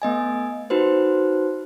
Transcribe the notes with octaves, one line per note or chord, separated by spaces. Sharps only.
A3 B3 D#5 G#5
D#4 F#4 B4 C5